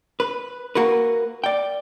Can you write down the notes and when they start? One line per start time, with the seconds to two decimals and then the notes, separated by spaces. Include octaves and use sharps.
0.20 B4
0.75 A#3 F#4 A#4 B4
1.44 D5 G5